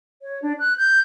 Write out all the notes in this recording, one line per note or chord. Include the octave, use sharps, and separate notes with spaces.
C#5
D4
F#6
G6